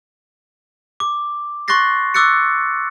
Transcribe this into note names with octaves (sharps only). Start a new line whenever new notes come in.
D6
C6 C#6 F#6 A6 A#6 C7
C#6 D6 E6 F#6 A6 C#7